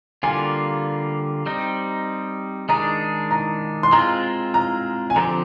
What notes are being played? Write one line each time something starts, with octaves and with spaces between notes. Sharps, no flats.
D3 G3 A#3 F4 G#5
G3 C4 D#4
D#3 G#3 D4 G#4 A#5
A#5
C6
G#3 C4 F4 A#5
A#5
G#5
D3 F3 C4 G4 A#5